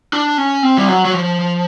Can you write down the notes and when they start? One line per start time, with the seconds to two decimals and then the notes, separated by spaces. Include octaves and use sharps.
0.13 D4
0.38 C#4
0.63 C4
0.78 G3
0.88 F#3
1.05 F#3
1.14 F3